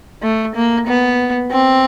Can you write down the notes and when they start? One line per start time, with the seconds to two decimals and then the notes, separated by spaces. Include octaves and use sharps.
0.22 A3
0.55 A#3
0.87 B3
1.51 C4